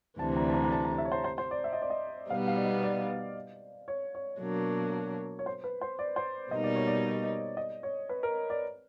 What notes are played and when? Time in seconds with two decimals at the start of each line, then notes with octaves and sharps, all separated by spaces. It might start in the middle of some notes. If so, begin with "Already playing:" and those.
0.19 D2 C3 E3 G3 A5
0.37 A#5
0.49 A5
0.54 A#5
0.64 A#5
0.72 A5
0.85 A#5
0.98 E5
1.05 C#5
1.12 C5
1.24 C5
1.38 C5
1.51 D5
1.64 E5
1.73 D#5
1.82 D5
1.90 D#5
2.30 B2 G3 B3 D#4 F5
2.48 F5
2.56 D5
2.65 D#5
2.83 D5
3.88 C#5
4.15 C#5
4.41 B2 F#3 A#3 D4
5.39 C#5
5.46 C5
5.64 B4
5.81 C5
5.99 D5
6.16 C5
6.51 B2 G3 A#3 D#4 D#5
6.64 D5
6.76 C#5
6.87 D5
7.57 D#5
7.83 C#5
8.09 B4
8.23 A#4
8.50 D5